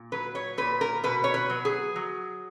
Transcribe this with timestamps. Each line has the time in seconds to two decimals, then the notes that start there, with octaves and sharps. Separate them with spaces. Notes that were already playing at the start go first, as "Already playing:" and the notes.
Already playing: A#2
0.12 F#3 B4
0.35 C#5
0.58 A#2 B4
0.81 A#4
1.04 B2 B4
1.24 C#5
1.34 B4
1.50 F#3
1.65 G#4
1.96 F#3